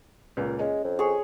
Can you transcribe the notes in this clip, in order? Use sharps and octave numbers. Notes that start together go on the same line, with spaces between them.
C#2 A#2 A#3
G#3 C#4
F2
G#4 C#5